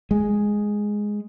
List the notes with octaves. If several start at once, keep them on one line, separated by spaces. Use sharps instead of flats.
G#3